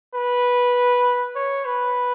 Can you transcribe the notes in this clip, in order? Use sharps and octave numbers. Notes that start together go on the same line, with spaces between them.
B4
C#5
B4